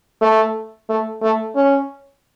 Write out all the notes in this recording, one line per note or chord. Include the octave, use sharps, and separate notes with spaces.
A3
A3
A3
C#4